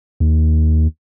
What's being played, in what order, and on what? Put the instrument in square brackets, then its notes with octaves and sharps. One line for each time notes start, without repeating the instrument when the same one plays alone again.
[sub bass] D#2